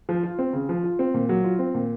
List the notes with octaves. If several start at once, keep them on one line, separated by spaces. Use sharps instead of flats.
F3
F4
C4
C#3
F3
F4
C4
A#2
F#3
F4
C4
A#2